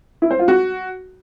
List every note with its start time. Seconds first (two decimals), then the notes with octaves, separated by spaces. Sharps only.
0.22 E4
0.31 C5
0.39 F4
0.48 F#4